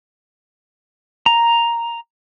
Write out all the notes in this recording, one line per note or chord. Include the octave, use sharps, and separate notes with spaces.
A#5